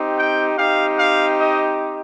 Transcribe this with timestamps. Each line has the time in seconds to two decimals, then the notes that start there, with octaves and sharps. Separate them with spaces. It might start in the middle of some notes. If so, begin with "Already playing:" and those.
Already playing: C4 D#4 G4
0.16 G5
0.56 C4 D#4 G4 F5
0.97 F5
1.37 D#5